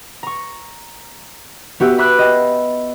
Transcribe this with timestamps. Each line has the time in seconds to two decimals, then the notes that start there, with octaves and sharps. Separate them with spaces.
0.23 A#5 C#6
1.80 B3 F#4 G4 E5
1.98 B4 E5 B5 D6 F#6
2.19 D#5 G5